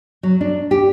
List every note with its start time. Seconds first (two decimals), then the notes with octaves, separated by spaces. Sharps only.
0.23 F#3
0.41 D4
0.71 G4